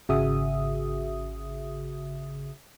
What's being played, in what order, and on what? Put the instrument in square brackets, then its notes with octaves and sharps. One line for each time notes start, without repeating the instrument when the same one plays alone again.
[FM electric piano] G#1 C#3 F#4 G#4 E5 D#6